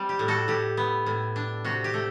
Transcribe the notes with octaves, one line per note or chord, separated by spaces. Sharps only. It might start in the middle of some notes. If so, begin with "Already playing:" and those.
Already playing: G3 C4
G4
A2
F#4 A4
A2 G4
B3
A2
D4
C3 F#4
G4
A3